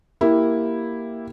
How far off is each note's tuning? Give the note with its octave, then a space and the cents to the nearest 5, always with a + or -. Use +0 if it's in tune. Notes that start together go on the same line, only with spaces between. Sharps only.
A#3 +0 E4 -5 G4 +0